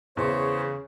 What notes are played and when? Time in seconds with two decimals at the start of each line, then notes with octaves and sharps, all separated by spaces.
0.17 E2 C#3 C5 C#5